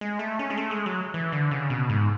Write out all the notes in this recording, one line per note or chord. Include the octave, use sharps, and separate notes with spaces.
G#3
A3
C#4
G#3
A3
G#3
F#3
E3
D3
C#3
B2
G#2